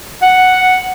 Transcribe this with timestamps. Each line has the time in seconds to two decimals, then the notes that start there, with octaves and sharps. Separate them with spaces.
0.22 F#5